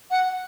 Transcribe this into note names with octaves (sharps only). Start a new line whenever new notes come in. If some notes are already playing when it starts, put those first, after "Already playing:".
F#5